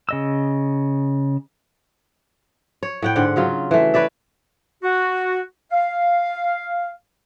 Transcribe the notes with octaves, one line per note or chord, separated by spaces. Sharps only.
C#3 D#5 E6
C#5
A2 F#5 G5
G#2 D3 F#5
C#3 F#3 F4
E3 A3
B4 C#5 D5 E5
F#4
F5